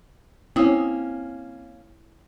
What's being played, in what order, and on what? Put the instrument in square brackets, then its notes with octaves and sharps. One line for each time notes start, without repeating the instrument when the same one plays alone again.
[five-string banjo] A#3 C#4 [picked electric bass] C4 [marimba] E4 D#6